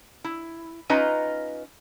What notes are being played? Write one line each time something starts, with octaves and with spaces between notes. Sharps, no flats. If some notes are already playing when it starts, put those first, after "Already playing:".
E4
C#4 D#4 F4 B4 D#5 A#5